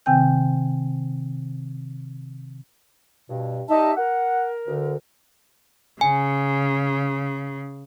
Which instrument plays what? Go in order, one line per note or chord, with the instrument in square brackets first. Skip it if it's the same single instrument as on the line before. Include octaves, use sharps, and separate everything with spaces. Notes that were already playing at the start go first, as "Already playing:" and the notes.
[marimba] C3 D#3 C4 G5 G#5 G6
[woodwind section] G2 B2
[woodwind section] G3 G4 E5 [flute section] D#4 D#5 A5
[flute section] A#4 [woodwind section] F#5
[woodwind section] D2 D3
[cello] C#3 [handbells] G#5